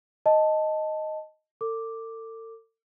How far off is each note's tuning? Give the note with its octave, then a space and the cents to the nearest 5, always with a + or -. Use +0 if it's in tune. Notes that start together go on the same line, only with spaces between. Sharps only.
D#5 +0 A5 +0
A4 +40 D6 +0